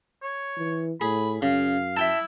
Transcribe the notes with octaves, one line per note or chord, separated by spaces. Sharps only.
C#5
E3
A2 G#4 B5
F#2 C#3 F5
E4 E5 G5 A5